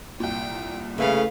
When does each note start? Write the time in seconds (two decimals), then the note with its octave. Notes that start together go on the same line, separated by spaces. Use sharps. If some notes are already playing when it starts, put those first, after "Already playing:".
0.20 C2 A#2 G5
0.98 C#3 A3 E4 A4 B4 F5